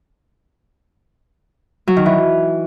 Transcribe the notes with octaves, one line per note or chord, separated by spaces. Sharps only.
F#3
D#3
E3